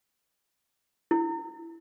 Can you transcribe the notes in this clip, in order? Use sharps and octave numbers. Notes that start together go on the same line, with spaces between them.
E4